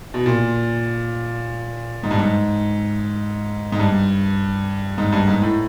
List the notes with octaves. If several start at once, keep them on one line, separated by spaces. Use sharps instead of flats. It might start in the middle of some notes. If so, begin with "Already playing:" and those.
B2
A#2
G#2
G2
G#2
G#2
G2
G#2
G2
G#2
A2